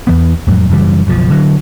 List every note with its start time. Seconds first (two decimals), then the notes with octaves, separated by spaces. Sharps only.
0.07 E2 E3 B3
0.47 F2 A2 F#3
0.69 F#2 C#3 E3 G3
1.07 F#1 B1 A#2 F3
1.30 D3 F#3